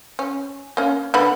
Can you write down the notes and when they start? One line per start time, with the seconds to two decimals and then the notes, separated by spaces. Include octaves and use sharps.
0.19 C#4
0.77 A#3 C#4
1.14 D3 B3 B5